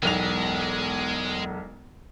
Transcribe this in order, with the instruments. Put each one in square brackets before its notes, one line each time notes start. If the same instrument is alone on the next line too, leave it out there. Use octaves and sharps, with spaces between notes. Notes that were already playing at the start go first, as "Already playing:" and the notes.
[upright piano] E1 B1 F7 [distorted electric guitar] G#3